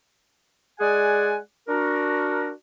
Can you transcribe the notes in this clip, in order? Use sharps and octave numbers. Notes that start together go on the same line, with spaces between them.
G#3 G#4 D5 F#5 G#5
D4 F#4 A#4